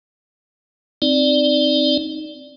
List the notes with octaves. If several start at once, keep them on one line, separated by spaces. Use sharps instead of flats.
C4 D#4 D5